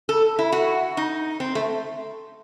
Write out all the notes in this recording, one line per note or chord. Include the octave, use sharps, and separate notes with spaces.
A4
E4
F#4
D#4
C4
A3